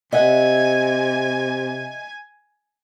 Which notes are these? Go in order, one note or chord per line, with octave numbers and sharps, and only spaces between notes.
C3 D#5 E5 F#5 G#5